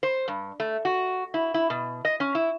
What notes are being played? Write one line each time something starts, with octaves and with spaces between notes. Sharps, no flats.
C5
G2
A3
F#4
E4
E4
B2
D#5
C#4
E4